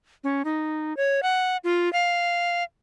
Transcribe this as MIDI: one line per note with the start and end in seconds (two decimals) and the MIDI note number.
0.24 0.42 61
0.45 0.96 63
0.97 1.21 73
1.23 1.57 78
1.64 1.92 65
1.93 2.63 77